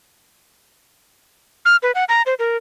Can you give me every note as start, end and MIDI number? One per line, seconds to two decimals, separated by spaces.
1.65 1.76 89
1.83 1.91 71
1.95 2.04 78
2.09 2.22 82
2.26 2.34 72
2.39 2.57 70